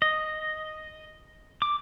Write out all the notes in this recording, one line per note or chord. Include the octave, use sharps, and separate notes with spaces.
D#5
D6